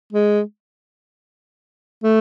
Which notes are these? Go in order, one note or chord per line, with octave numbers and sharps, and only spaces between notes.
G#3
A3